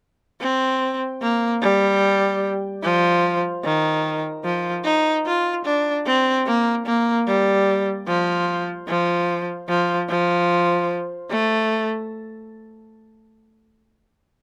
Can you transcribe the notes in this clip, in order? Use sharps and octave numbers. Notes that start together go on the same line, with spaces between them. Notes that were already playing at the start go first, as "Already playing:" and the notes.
C4
A#3
G3
F3
D#3
F3
D#4
F4
D4
C4
A#3
A#3
G3
F3
F3
F3
F3
A3